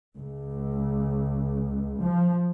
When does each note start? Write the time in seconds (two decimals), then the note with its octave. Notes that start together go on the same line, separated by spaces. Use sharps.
0.17 C#2
2.01 F3